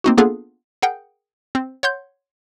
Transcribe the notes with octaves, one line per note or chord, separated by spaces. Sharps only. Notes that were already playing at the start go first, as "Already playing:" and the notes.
A#3 C4 D#4 F#4
A#3 B3 D4 F4 G#4 A4
G#4 A#4 F#5 G5 G6
C4
C#5 F#5 C6 G6